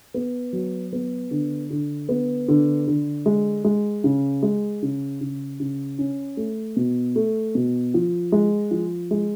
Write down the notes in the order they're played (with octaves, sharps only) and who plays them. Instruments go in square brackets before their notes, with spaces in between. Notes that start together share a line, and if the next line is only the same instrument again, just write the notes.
[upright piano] B3
F#3
B3
D3
D3
B3
D3
D3
G#3
G#3
C#3
G#3
C#3
C#3
C#3
C#4
A3
B2
A3
B2
F3
G#3
F3
G#3